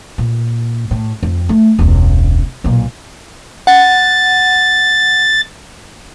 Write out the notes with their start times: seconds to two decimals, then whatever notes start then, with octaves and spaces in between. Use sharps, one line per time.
0.18 A#2
0.91 A2
1.23 F2
1.49 A3
1.79 E1 C#2
2.64 B1 A#2
3.67 F#5 A6